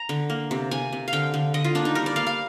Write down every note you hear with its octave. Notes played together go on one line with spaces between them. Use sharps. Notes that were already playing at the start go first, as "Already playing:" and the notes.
Already playing: A#5
D3
A#3
C3
C3 G#5
C3
F5
D3 G5
D3
D3 D#5
F4
A#3 D4
D#4
G3 A#4
D5
A#3 F5
F5